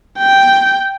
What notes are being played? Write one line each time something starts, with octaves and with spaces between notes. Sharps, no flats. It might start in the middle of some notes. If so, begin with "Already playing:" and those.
G5